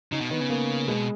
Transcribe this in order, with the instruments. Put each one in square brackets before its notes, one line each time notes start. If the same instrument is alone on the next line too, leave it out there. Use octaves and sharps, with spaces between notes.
[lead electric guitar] C#3 [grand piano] D#4
[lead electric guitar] B2
[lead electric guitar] D#3 [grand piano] B3
[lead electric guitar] C#3
[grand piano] A#3
[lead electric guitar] B2 [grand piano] G#3